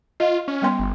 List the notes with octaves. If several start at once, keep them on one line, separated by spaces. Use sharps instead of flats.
F4 D#5
C#4
G3 B3 C6
G1